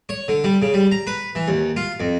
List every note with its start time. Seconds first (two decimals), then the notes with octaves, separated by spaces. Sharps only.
0.09 C#5
0.28 D3
0.44 G3
0.62 C#3
0.74 G3
0.92 A#5
1.07 B4
1.35 E3
1.48 D#2
1.77 F4
2.00 F2